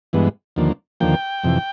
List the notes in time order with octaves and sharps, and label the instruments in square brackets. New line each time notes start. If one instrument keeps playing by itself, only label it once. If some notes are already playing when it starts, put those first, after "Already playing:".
[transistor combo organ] G2 E3 G#3 B3
D#2 D3 F3 A#3
D#2 D3 F3 A#3 G5
F2 C3 E3